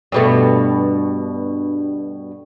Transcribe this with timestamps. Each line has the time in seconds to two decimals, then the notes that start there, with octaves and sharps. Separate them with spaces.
0.12 G2 B2 A3